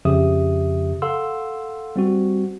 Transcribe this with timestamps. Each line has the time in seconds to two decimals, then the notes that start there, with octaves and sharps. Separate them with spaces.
0.05 F2 C#3 F3 G4 E5 D#6
1.02 A4 F5 F#5 C6 E6
1.96 G3 C4 F#4